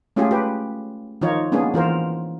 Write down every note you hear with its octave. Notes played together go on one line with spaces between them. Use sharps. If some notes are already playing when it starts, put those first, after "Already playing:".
G#3 A3 C#4 F4 G4 G#4
G4 B4
D#3 F3 D#4 F4 C#5
G#3 A#3 B3 C#4 D4 G#4
E3 F4 A#4 C5